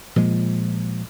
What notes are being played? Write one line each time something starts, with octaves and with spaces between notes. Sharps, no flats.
A#2 F3 G#3